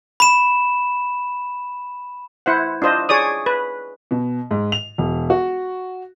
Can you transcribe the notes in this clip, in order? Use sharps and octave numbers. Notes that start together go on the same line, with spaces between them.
B5 E7
E4 C5 F#5
D4 F4 C5 D#5
G#4 C#5 D5 D#6
B4
B2
G#2
F7
E1
F#4